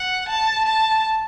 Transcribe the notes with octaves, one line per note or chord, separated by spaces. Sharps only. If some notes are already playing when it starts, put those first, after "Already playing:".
Already playing: F#5
A5
A5